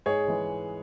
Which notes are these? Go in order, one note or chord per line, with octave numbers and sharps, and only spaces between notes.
G#2 G#4 C#5
E3 G#3